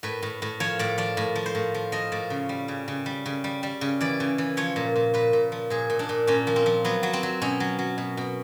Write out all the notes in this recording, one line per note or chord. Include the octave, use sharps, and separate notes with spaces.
A2 B4
A2
A2
F3 C#5
A2 D5
F3 D5
A2
F3
C5
A2
F3
F3 D#5
A2 D5
C#3
G3
C#3
C#3
G3
C#3
G3
G3
C#3
E3 D5
C#3
E3
F3 C#5
A#2
A#2
A#2 B4
A#2
F3
A#2 G#4
A#2
D4
A#2
A#2 C#4
F3
C4
F3
F#3 B3
F#3
C4
F#3
B2 C#4
F#3
F#3
B2
B2